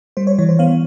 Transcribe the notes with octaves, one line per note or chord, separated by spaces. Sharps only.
G3 C5
C#5
E3 C#5
C5
B3 F5